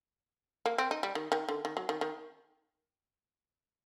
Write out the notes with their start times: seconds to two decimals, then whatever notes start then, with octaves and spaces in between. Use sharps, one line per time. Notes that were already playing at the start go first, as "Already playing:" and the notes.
0.66 A#3
0.78 C4
0.91 D#4
1.03 G3
1.15 D#3
1.32 D#3
1.49 D3
1.65 D#3
1.77 F#3
1.89 D#3
2.01 D#3